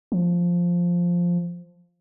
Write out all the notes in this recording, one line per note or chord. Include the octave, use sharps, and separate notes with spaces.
F3